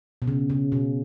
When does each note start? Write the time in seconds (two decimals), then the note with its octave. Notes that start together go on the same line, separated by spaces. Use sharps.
0.22 B2
0.27 C#3
0.50 C#3
0.72 B2